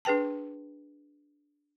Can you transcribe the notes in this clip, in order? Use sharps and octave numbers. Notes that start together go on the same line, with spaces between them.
D4 G#4 B4 G5 A5